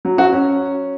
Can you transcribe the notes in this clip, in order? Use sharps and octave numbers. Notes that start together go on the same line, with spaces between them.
F#3
F#4
C#4